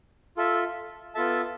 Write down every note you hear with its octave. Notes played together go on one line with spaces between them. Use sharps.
F4 A4 E5
B3 F4 A4 E5 A5